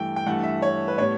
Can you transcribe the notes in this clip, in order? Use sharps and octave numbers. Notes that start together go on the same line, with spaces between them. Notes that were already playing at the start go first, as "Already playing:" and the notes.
Already playing: G2 E3 A3 G5
G5
G2 E3 A3 F#5
E5
C#5
B4
A2 G3 B3 C#5